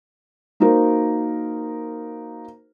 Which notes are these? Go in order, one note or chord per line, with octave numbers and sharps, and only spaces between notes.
A#3 D#4 F#4 A#4 C5